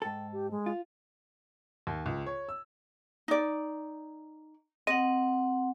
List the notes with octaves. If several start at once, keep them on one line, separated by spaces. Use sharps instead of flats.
G#2 A4 G5
G4
G#3
F4
D#2
C#2
C#5
E6
D#4 D5
C4 D#5 F#5